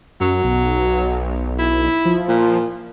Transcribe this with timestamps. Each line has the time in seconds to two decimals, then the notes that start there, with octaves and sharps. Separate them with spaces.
0.21 F#2 F#3
0.44 B1
1.59 E4
2.05 F3
2.28 A#2